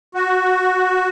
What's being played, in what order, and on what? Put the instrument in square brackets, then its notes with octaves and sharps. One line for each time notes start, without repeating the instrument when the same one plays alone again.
[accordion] F#4